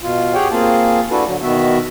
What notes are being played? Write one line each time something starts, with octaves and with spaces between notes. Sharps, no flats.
B2 F4
G4 G#4 C#5 F#5 G5
A#3 C4 F4 G#4 A5
D4 E4 F#4 A4 B4
D3 F#3
B2 D#3 B3 F#4 E5